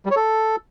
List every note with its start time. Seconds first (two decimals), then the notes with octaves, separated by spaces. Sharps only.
0.05 G3
0.11 C#5
0.16 A4